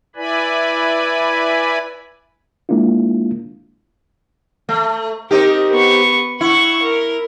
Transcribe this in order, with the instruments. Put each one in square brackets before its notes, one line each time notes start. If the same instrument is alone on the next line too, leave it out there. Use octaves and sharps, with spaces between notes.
[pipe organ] E4 B4 D5 G#5 B5
[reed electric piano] G#3 A#3 D4 E4 F4
[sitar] A3
[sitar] C4 D#4 G4 [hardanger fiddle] A#4
[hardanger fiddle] B3 C#6
[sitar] E4 [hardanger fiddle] F#5 C#6
[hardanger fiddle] A#4